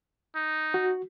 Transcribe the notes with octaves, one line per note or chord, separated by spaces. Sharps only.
D#4
F#4